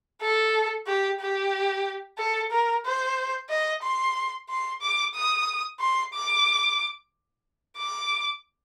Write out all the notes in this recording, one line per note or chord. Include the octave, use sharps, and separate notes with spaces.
A4
G4
G4
A4
A#4
C5
D#5
C6
C6
D6
D#6
C6
D6
D6